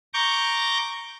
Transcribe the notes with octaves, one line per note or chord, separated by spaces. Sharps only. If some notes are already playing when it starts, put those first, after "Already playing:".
A#5 C#6 D6 G6